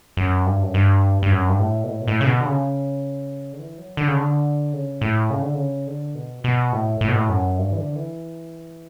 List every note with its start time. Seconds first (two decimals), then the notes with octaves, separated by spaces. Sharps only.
0.17 F#2
0.46 G2
0.63 F#2
0.74 G2
1.23 G2
1.31 F#2
1.49 G2
1.59 A2
1.84 B2
1.88 A2
2.01 B2
2.08 A2
2.21 C#3
2.26 B2
2.41 D3
2.45 C#3
3.53 D3
3.59 E3
3.78 F#3
3.97 D3
4.08 C#3
4.17 D3
4.73 C#3
5.01 A2
5.31 C#3
5.42 D3
5.54 C#3
5.87 D3
6.15 B2
6.44 B2
6.72 A2
7.01 A2
7.08 B2
7.15 A2
7.29 F#2
7.58 G2
7.72 E3
7.77 D3
7.96 E3